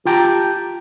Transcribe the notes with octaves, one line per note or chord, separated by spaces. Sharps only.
F4 G4 G5 A5 A#5